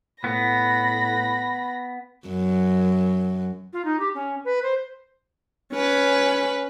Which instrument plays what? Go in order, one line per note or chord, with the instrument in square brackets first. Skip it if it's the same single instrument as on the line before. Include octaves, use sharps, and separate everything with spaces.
[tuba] A2 [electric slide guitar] B3 [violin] B5 A#6
[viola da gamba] F#2
[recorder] F4
D#4
G4
C#4
B4
C5
[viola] C#4 B4